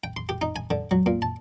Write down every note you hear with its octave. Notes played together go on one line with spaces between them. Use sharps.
G5
C6
G4
D#4
G#5
D3
F#3
A#2
A5